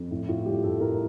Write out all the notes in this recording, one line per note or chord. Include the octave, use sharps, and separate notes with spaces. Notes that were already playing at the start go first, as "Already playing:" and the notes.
Already playing: F2
A2
A2 F4
G3 G4
A2 A4
A2 A#4